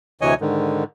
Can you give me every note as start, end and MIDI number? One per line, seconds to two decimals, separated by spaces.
0.21 0.34 38
0.21 0.34 48
0.21 0.34 52
0.21 0.34 73
0.21 0.34 75
0.21 0.34 80
0.41 0.84 44
0.41 0.84 50
0.41 0.84 51